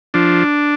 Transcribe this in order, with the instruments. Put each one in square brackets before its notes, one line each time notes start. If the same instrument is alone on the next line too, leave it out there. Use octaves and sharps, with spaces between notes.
[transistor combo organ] F3 D4